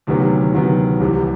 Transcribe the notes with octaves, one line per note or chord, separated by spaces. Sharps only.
D2 C3 D#3 F#3 B3
D2 C3 D#3 F#3 B3
C2 C3 E3